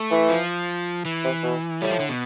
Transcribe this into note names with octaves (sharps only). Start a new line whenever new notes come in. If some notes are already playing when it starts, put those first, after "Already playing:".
Already playing: A3
E3
F3
E3
C3
B2
A2 G3
F3
D3
B2